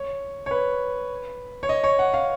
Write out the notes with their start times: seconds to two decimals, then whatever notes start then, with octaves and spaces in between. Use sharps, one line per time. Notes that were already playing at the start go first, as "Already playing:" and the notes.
Already playing: C#5
0.46 C#5
0.51 B4
1.63 C#5
1.69 D#5
1.84 C#5
1.99 F#5
2.14 F5